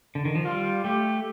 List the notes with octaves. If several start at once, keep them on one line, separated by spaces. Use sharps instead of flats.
D3
D#3
F3
G3 F4
A3 G4